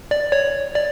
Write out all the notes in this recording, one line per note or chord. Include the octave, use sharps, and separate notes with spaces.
D5
C#5
D5